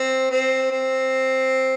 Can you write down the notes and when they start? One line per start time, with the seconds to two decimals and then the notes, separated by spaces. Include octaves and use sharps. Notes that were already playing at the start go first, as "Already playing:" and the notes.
Already playing: C4
0.31 C4
0.71 C4